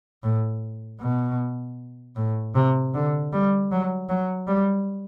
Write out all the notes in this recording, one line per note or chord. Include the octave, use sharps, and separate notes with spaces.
A2
B2
A2
C3
D3
G3
F#3
F#3
G3